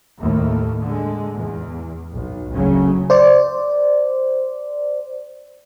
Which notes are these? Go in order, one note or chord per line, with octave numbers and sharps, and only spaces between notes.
D#2 A2 A3 A#3
D3 G#3
E2
B1
F#1 D2 C#3 F#3 C#4
C5 D5